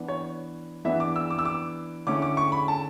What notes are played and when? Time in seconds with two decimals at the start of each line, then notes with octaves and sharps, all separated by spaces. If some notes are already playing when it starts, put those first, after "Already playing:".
Already playing: E3 B3 D4
0.08 C#5
0.85 E3 B3 D4 E5
1.00 D6
1.16 E6
1.30 D6
1.39 E6
1.45 D6
2.07 D3 A3 C#4 E4 D6
2.22 D6
2.37 C#6
2.52 B5
2.68 A5